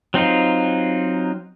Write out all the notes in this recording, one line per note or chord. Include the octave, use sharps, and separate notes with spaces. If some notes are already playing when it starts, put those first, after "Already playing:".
F#3 C4 D#4 F4